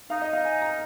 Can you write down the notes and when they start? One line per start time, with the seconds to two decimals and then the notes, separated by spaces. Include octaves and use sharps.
0.10 D#4 F5
0.22 D#5
0.33 F5
0.45 G#5
0.62 A#5